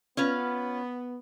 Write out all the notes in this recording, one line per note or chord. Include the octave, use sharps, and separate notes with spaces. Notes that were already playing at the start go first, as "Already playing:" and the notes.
B3 C#4 F4 B4